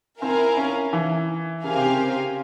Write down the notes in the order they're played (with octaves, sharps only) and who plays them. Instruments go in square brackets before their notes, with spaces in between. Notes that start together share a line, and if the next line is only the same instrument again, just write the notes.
[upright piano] C4 [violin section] E4 A#4 F5 G#5
[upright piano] C#4
E3
[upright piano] C#3 [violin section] C4 G4 A#4 F5 G#5
[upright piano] C3
C#3